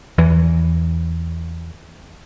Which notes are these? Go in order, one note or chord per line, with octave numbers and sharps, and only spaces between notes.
E2 E3